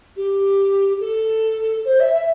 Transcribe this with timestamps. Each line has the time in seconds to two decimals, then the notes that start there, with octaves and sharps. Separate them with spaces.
0.16 G4
1.00 A4
1.85 C5
2.00 E5
2.13 E5